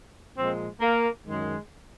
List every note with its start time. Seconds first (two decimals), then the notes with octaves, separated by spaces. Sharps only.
0.36 A#2 F3 G#3 C4
0.80 A#3
1.25 F#2 D#3 G#3